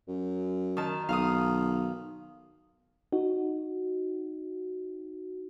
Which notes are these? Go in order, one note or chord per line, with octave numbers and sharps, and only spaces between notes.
F#2
D#3 A5
B1 F5 D#6
D#4 F#4